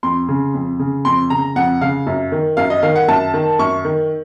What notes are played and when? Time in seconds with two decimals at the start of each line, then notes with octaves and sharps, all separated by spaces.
0.03 F2 C6
0.28 C#3
0.54 F2
0.79 C#3
1.05 F2 C6
1.30 C#3 A#5
1.56 F2 F#5
1.81 C#3 F5
2.07 F#2
2.32 D#3
2.57 F#2 F5
2.70 D#5
2.83 D#3 F5
2.96 F#5
3.08 F#2 A5
3.34 D#3
3.59 F#2 C#6
3.85 D#3